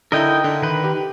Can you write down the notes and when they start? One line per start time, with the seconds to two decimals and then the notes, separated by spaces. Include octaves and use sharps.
0.12 D3 D#4 E4 A#4 D#5 G5
0.44 D3
0.62 D#3 B4
0.84 G4